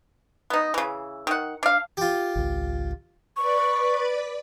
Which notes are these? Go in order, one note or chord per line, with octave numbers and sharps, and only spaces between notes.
B3 D#4
C#3 E3
D#3 F#5
D4 F5
F4 G4
G#1 C#2
B4 D5 B5 C#6